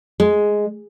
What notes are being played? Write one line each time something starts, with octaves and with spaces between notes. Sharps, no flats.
G#3